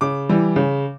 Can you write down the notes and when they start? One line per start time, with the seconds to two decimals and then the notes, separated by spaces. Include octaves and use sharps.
0.01 C#3 D6
0.29 E3 G3
0.56 C#3